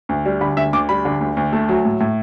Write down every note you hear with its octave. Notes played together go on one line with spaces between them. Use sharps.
D2
G3
D3 B5
D2 E5
D2 D6
G3 B5
D3
D2
D2
A3
F#3
A2
A2